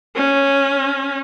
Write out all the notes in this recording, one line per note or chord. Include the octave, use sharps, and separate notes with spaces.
C#4